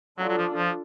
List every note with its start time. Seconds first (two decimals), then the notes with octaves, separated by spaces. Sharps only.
0.18 F#3 D4 F4 A4
0.29 F#3
0.38 F3
0.56 F3